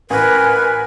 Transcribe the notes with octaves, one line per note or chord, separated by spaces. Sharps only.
A1 A#4 B4 G#5